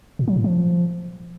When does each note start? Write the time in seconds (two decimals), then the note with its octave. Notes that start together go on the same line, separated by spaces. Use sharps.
0.19 A#2
0.28 F#3
0.36 A2
0.44 F3